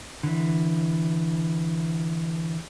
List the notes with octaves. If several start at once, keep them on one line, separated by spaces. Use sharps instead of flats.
D3 E3